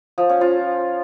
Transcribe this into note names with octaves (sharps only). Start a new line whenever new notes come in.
F3
C#4
F4